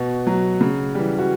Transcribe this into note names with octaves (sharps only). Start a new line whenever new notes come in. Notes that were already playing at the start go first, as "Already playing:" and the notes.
Already playing: B2 F#4
F#3
C#3
E3 G3
F#4